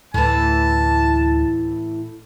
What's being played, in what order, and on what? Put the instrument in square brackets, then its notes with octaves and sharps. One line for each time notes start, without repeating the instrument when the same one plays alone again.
[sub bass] D2 [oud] A2 E3 [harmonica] A5